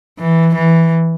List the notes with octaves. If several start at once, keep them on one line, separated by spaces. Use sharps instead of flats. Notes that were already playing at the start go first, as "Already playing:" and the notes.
E3
E3